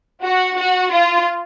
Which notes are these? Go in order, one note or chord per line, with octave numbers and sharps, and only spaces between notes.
F#4
F#4
F4